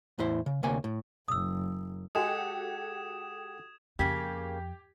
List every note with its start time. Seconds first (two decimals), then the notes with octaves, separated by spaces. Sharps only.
0.19 E2 A2 E4 C5
0.46 C#3
0.63 D2 C3 A#3 C#5 G#5
0.84 A2
1.28 F#1 D#6 E6
2.15 G#3 F#4 G4 A4 D#6 G#6 E7
3.99 F2 C#3 A#3 G4 G#6 B6